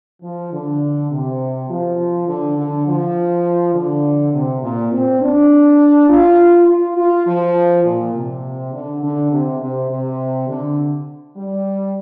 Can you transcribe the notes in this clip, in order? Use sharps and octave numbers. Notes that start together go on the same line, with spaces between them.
F3
D3
C3
F3
D3
D3
F3
D3
C3
A#2
C4
D4
F4
F4
F4
F3
A#2
C3
D3
D3
C3
C3
C3
D3
G3